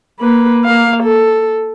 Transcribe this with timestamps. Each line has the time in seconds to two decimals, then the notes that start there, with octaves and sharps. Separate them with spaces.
0.20 A#3 B4
0.64 A#3 F5
1.03 A4